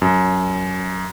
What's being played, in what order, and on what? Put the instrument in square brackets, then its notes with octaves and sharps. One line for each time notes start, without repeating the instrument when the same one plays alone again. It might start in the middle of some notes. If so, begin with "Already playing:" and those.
[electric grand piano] F#2